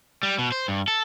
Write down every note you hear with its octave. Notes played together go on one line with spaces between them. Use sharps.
G3
B2
C5
G2
A4